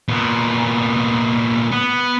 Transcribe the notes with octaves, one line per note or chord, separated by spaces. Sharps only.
A#2 B3
B3